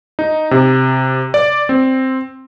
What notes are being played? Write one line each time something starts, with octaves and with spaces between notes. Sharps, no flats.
D#4
C3
D5
C4